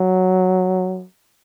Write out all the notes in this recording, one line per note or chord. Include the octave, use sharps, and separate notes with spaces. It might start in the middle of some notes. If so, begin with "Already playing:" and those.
Already playing: F#3